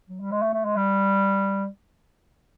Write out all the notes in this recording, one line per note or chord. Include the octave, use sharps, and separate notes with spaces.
F#3
G3
G#3
A3
A3
G#3
G3